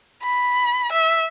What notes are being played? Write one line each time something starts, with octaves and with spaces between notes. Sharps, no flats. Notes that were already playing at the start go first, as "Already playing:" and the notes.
B5
E5